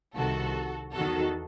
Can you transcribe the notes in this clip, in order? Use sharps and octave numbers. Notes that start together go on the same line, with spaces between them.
C2 C3 D#3 F#4 A4
E2 D#3 F#4 A4